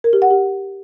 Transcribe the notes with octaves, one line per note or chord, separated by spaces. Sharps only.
A#4
G4
F#5
G4